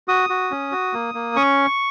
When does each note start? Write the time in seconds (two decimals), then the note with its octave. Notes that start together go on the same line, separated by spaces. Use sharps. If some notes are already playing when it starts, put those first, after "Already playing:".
0.08 F#4 D#6
0.30 F#4
0.51 C#4
0.72 F#4
0.93 A#3
1.15 A#3
1.36 C#4 C#6